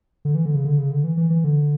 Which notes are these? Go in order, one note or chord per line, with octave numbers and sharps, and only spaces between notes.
D3
E3
D3
C#3
D3
C#3
D3
E3
E3
E3
D3